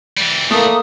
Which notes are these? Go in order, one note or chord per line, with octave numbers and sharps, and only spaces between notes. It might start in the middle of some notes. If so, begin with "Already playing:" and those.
E3 G3
A3 A#3 D#6